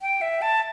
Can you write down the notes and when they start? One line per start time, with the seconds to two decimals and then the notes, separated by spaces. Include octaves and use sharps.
0.02 G5
0.21 E5
0.42 A5